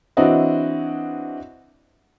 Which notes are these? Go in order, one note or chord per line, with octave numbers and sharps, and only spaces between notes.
E3 C4 D4 E4 F#4 D#5